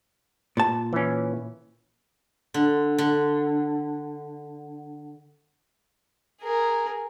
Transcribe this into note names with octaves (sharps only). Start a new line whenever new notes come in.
A#2 A5
E3 C#4
D3
D3
G#4 A#4